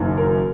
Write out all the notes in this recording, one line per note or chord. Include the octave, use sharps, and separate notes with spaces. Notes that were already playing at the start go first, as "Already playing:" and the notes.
Already playing: F#1 F#2 D#3
A#4